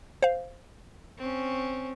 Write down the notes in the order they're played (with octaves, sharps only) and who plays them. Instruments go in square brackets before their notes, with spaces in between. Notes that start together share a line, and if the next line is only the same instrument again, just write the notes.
[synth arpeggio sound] C5 F5
[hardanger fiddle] C4 C#4